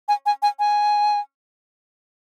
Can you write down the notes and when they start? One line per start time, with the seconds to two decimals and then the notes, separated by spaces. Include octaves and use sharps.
0.08 G#5
0.26 G#5
0.42 G#5
0.59 G#5